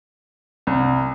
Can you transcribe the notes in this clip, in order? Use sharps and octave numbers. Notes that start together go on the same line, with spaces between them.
C2